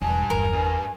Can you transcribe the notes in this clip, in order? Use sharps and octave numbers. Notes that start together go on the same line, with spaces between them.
E1 G2 G#5 A5
G1 E2 A#4
G2